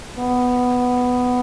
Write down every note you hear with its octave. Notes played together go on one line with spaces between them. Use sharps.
B3